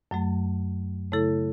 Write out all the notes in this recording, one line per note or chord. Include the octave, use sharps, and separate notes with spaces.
F#2 F#3 A3
C#3 A3 E4 A4